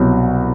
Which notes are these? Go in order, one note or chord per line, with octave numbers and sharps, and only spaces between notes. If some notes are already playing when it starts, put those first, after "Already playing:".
Already playing: C2 B2 F#3